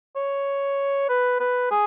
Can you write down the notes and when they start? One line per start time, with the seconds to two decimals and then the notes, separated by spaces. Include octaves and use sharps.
0.16 C#5
1.09 B4
1.40 B4
1.71 G#4